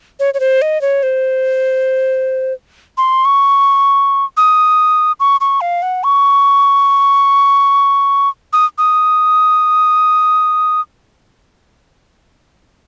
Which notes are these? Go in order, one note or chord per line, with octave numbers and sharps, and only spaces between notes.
C#5
C#5
C5
D#5
C#5
C5
C6
C#6
D#6
C#6
C#6
F5
F#5
C#6
D#6
D#6